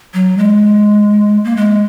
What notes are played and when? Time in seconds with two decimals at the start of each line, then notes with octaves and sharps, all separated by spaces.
0.14 F#3
0.37 G#3
1.45 A#3
1.57 G#3